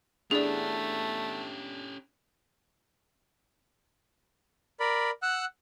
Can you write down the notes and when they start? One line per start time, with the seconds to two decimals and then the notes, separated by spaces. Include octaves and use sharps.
0.31 A3 B3 C#4 D4 E4 G4 G#4 D5
4.80 A#4 D5 B5
5.23 F#5 E6 F#6